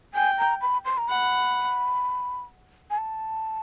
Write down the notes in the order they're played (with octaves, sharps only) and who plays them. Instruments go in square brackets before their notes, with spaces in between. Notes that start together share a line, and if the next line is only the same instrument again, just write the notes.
[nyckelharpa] G5 [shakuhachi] G#5
[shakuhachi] A#5
B5
C6
A#5
[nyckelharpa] F#5 [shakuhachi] B5
[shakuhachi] G#5
A5